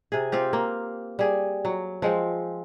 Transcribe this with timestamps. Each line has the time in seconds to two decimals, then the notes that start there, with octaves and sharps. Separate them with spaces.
0.12 C3 G#4
0.32 C4 F4 G4
0.53 A#3
1.19 G3 G#4
1.65 F#3
2.02 F3 G#3 C4